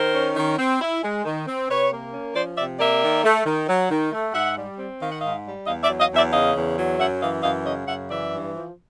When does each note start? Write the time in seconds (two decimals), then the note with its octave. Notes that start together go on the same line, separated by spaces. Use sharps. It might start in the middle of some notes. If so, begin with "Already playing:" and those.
Already playing: D#3 A#4 C5
0.14 C#4
0.37 D#3
0.58 C4
0.81 E4
1.03 G#3
1.25 D#3
1.47 C4
1.69 C3 B4 C#5
1.92 A#3
2.13 C#4
2.35 F3 C5 D5
2.57 C3 D5 E5
2.80 A#3 D5 E5
3.02 D#3
3.24 A3
3.46 D#3
3.68 F#3
3.90 D#3
4.12 A3
4.34 G#2 E5 F#5
4.57 G3
4.78 C4
5.01 D#3 F5
5.11 F#5
5.21 G#2 D#5 F5
5.44 G3
5.66 E2 D#5 F5
5.83 D5 E5
5.89 F#3
6.00 D#5 F5
6.11 E2
6.16 D5 E5
6.33 C#3 D#5 F5
6.56 E2
6.77 F#3
6.99 F#2 E5 F#5
7.21 E3 D#5 F5
7.43 F#2 D#5 F5
7.65 C#3 C#5 D#5
7.87 F#2 E5 F#5
8.10 E3 D5 E5
8.32 G2
8.54 F3